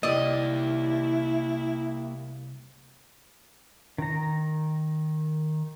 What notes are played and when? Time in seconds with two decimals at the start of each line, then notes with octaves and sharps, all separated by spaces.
0.03 C2 A#2 A#3 E4 G4 D5 D#5
3.98 D#3 A#5